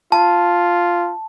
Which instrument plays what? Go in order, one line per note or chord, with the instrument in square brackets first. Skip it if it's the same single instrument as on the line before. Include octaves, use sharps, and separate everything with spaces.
[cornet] F4 [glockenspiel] A5